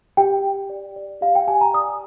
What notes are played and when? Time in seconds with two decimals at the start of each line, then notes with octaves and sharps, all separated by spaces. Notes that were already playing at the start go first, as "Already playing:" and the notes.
0.17 G4 G5
0.44 G4
0.70 D5
0.96 D5
1.21 G4 F5
1.35 G5
1.47 G4 G#5
1.61 A#5
1.74 D5 D#6